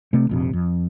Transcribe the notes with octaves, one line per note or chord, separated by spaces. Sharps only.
C3 A3 C4
A#1 F2 C3
F2